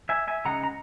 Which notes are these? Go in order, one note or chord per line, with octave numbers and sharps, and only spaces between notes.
E5 G#5
E5 G#5
C#3 G#3 D#4 F#5 A#5
A#5